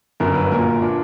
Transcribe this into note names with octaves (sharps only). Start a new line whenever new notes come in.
G1 F#2 D3 A#4
B4
A#1 A#2 A#4
A#2 D4